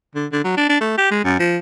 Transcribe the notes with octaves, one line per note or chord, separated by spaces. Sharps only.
D3
D3
F#3
D4
D4
A3
G4
G#3
F#2
F3